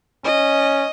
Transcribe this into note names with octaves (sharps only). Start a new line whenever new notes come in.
C#4 D#5